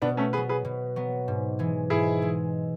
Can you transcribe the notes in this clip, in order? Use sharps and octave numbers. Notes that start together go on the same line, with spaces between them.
B2 B3 D4
A3 C#4
F#3 B3 G#4 B4
G#4 B4
B2
F#3 B3
G#2
E3 G#3
G#2 E4 G#4
E3 G#3